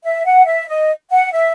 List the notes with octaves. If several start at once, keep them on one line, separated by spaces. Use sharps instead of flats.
E5
F#5
E5
D#5
F#5
E5